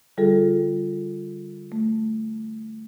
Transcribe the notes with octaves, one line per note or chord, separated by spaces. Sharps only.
D3 G3 F4 G#4 A4
A3